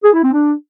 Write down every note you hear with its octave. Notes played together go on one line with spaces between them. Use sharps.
G#4
E4
C4
D4